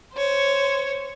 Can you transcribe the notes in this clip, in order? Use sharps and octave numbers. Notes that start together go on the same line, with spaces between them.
C5 C#5